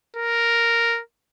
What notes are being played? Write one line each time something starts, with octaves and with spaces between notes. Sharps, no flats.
A#4